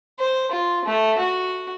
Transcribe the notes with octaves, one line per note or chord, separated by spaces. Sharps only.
C5
F4
A3
F#4